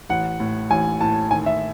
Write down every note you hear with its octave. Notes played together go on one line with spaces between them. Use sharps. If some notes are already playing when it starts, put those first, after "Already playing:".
A1 F#5
A2
A1 G#5
A2 A5
D#3 G#5
E5